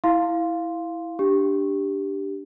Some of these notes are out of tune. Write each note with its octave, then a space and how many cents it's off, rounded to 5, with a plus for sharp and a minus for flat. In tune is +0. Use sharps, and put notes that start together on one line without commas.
E4 -5 F5 +0 C6 +0
D4 +0 G4 +0